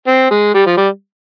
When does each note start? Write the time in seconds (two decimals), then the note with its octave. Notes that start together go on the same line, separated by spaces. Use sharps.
0.07 C4
0.30 G#3
0.54 G3
0.66 F3
0.77 G3